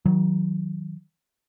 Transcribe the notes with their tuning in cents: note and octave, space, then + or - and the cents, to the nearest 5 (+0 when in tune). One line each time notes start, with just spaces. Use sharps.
D#3 +35 F#3 +0